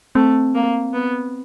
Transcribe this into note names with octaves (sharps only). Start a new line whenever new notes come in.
A3 C4
A#3
B3